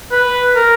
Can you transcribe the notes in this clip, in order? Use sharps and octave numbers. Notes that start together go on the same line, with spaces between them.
B4
A#4